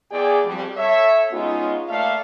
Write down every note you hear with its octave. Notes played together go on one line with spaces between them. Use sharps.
E2 G#4 D5 G5
F2 G3
A4 C#5 E5
G#3 B3 C#4 D#4 F4
A3 A#3 A4 D5 E5 F5